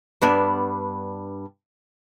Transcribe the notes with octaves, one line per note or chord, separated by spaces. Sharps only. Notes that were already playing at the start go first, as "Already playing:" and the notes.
G2 B3 D4